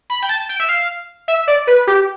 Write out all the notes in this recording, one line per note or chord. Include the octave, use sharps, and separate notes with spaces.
B5
G5
A5
G5
E5
F5
E5
D5
B4
G4